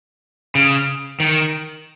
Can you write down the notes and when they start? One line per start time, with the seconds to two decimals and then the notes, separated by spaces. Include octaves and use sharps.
0.55 C#3
1.20 D#3